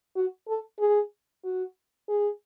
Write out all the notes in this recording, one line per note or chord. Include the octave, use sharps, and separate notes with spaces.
F#4
A4
G#4
F#4
G#4